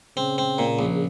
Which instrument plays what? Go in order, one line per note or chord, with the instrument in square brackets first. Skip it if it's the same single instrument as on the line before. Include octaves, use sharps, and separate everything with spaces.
[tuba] C#3 [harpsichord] C4
[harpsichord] C4
A#2
A#1